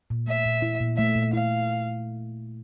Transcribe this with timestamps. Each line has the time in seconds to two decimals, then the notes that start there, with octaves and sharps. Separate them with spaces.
0.10 A#2
0.27 A3 E5
0.46 A#2
0.62 E4
0.80 A#2
0.98 A3 E5
1.16 A#2
1.33 E4 F5